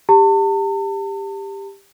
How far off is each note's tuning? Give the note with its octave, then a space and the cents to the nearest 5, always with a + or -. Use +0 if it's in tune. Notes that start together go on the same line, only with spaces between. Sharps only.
G4 +15 A5 +40